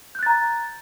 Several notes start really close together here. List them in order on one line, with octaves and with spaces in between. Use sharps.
G6 F#6 A6 A#5